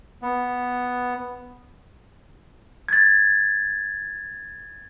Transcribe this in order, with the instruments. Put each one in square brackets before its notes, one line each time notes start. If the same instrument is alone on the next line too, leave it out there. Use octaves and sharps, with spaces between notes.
[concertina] B3
[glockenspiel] G#6 A6